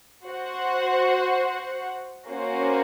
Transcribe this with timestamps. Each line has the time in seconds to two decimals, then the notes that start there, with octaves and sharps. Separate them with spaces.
0.24 F#4 C5 F#5
2.27 A#3 C#4 F#4 C5